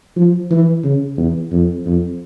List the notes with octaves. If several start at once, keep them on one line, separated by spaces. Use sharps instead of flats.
F3
E3
C#3
E2
F2
F2